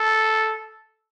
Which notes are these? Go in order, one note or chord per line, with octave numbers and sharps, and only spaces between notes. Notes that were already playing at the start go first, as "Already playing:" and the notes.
Already playing: A4